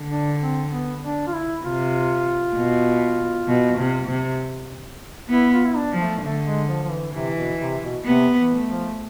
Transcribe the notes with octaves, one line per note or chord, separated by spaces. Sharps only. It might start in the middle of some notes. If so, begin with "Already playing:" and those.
Already playing: D3
D4
C4
B3
D4
F4
E4
C3 F4
B2
B2
C3
C3
B3 E4
F4
E4
D4
F3
A3
D3 A3
G#3
F3
F3
E3
C3 E3
B2
C3
B2
C3 B3
E3
A3
F3